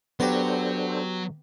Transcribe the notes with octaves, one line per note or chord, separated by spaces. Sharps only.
F#3 B3 D4 G4 A4 C5 A#5 C6